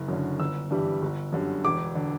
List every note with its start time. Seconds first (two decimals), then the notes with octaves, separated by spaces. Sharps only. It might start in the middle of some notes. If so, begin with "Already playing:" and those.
Already playing: F#1
0.08 F#2 D3
0.39 G1 E6
0.71 G2 E3 G3
1.02 G1
1.32 F#2 D3 G3
1.64 E1 D6
1.95 D3